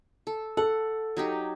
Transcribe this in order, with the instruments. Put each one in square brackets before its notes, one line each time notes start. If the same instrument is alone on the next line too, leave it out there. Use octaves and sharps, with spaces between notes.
[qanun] A4
[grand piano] A4 [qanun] F#5
[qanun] F#3 D#4 G4